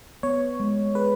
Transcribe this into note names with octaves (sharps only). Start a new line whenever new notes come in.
B3 C#5
G#3
G#4 B4